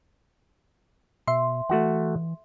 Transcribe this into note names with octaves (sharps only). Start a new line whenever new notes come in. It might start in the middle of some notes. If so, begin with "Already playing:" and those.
B2 E5 C6
E3 A3 F#4 F#5